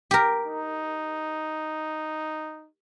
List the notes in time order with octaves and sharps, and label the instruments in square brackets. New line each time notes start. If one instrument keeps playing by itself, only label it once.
[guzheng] G4 A#4
[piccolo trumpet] D#4